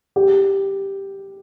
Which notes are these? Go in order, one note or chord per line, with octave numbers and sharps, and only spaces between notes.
G4